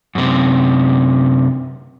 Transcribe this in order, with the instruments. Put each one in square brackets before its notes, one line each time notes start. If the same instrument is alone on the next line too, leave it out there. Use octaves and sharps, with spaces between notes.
[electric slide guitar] F#2 C3